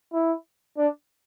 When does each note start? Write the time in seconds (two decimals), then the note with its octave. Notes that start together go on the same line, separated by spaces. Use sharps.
0.13 E4
0.78 D4